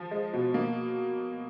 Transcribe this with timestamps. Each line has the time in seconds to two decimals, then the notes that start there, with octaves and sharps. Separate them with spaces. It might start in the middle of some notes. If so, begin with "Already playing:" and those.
Already playing: F3
0.11 G#3
0.34 B2
0.54 A#3